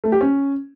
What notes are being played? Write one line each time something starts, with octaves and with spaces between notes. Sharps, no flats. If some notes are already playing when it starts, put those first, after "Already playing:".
A3
G4
C#4